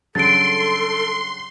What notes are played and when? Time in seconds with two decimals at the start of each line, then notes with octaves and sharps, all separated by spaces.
0.15 G2 C#3 F#3 A4 C6 A6 D7